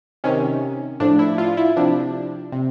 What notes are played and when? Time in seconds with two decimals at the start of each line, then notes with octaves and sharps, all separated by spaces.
0.24 C3 D#3 C#4
1.00 A2 F3 D4
1.19 E4
1.38 F4
1.57 E4
1.77 C3 F3 D4
2.52 C3